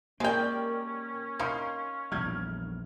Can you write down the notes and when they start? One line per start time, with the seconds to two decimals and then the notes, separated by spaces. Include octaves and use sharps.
0.20 G#3 A#3 C#4 G4 A#4 D5 G5
1.39 D#4 A#4 F5 C6
2.12 A#1 E2 G3 F6 G#6